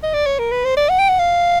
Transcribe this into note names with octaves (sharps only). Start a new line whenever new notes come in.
D#5
D5
C#5
A#4
B4
C5
D5
F#5
G5
F#5
F5